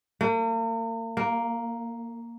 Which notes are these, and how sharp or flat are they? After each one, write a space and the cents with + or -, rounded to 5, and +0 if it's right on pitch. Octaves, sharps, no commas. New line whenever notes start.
A#3 -40
A#3 +0